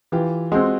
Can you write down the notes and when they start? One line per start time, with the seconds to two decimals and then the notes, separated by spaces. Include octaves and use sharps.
0.12 E3 F4 G4
0.52 G#3 C4 F#4 G#4